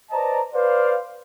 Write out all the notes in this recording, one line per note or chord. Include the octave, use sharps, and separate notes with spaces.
B4 C5 D5 D#5 A5 A#5
B4 C5 D5 F5